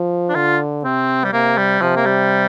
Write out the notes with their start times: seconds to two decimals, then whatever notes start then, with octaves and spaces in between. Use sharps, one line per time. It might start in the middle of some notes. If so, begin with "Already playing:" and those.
Already playing: F3
0.29 D4
0.35 D3 F4
0.84 C3 C4
1.24 G3
1.33 C3 A#3
1.57 G3
1.81 C3 F3
1.96 A#3
2.06 G3